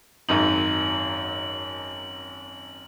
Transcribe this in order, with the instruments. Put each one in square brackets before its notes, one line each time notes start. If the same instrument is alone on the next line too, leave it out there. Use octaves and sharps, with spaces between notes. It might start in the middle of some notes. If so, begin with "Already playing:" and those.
[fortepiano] G#1 F#2 D#4 [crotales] F#7